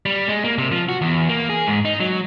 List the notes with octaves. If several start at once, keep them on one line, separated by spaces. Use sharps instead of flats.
G3
G#3
A#3
C3
F3
F#4
E2
A#3
G#4
G#2
D#4
F#3